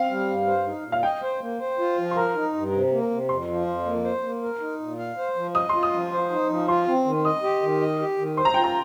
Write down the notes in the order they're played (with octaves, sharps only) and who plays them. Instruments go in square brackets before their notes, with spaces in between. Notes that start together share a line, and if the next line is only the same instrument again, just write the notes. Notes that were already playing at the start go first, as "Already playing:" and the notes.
Already playing: [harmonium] C4 [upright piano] F5
[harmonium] G3
G2
C5
D#4
A#2
[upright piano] F5
[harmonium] D#5 [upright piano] G5
[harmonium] C5
A#3
C5
F4
F3
[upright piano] C6
[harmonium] A#4 [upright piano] A#5
[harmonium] D#4
G2
C3
A#3
C3
[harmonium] F2 [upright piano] C6
[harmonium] F3
F2
A#3
C5
A#3
A#4
D#4
A#2
F5
C5
F3
[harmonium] D#5 [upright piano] D#6
[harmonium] F4 [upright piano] C6
[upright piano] D#6
[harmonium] F3
C5
D#4
F3
[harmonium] F4 [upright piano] C6
[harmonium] C4
D#3
[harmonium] D#5 [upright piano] D#6
[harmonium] G4
D#3
D#5
G4
D#3
[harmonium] C5 [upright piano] C6
[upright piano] A#5
[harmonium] F4 [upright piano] G5
[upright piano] A#5